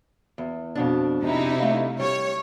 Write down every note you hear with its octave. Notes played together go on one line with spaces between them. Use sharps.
E2
F2 B2 D4
C3 D#4 E4
A3 F5
G3 C#5